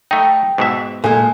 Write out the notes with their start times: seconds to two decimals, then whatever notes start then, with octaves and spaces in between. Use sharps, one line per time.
0.11 A3 D#4 G5
0.58 G#2 B2 E5
1.04 A#2 G#3 A4 G#5